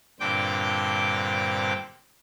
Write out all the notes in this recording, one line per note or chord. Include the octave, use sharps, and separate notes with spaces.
G2 A#2 D3 C4 G5 D6